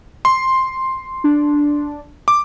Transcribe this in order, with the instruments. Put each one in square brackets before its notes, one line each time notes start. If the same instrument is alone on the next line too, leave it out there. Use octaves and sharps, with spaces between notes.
[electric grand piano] C6
[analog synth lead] D4
[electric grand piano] D6